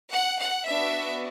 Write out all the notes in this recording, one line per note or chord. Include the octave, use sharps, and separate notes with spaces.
F#5
F#5
B3 D4 F#4 E5